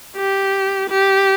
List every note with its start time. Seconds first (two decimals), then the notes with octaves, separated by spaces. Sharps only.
0.17 G4
0.90 G4